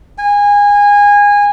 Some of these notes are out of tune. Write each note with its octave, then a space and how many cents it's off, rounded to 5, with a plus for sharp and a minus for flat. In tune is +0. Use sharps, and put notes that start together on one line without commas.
G#5 -25